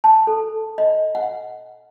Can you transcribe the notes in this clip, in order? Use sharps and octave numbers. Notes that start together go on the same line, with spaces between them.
A5
A4
D#5
F#5